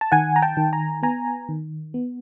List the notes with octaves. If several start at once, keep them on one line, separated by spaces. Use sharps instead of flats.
A5
D#3 F#5 G#5
A#5
G5 A5
D#3
G#5 A#5
B3 G#5 A#5
D#3
B3